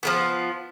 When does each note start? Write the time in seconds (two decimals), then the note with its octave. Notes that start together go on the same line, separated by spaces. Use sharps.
0.03 F3 G#3 B3